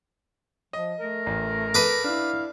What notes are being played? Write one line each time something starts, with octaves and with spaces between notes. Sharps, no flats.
F3 D#5
A3 A#4
A1
A4 B4 A5 D6 D#7
D4 E4 F5